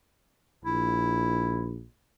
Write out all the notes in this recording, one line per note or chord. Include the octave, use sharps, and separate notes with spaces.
A#1 E4